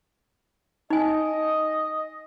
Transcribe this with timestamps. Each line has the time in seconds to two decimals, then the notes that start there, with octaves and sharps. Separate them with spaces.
0.90 D#4 D#5 G#5